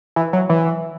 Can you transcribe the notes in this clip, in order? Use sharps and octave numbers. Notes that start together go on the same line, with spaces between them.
E3
F#3
E3